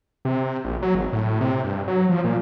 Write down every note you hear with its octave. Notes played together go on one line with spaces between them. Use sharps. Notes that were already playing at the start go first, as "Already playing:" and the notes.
C3
A#1
F#3
G#1
A2
C3
G2
F#3
F3
A#2